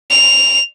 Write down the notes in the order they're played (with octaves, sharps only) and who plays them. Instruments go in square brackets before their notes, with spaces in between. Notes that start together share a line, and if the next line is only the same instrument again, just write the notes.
[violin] F7